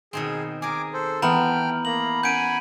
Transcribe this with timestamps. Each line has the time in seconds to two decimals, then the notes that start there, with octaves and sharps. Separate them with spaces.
0.13 B2 D#3 C4 G#4
0.62 G#4 A#4 G#5 D6
0.93 A4 C5
1.22 E3 A3 B3 G5 A#5 F6 F#7
1.85 A#3 A#5 F#7
2.23 C#4 F#5 G#5 B5 G6 D7 D#7